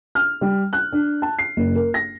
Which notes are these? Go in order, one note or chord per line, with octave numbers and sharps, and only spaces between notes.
F6
G3
F#6
D4
A5
C7
F#1
A#4
A#6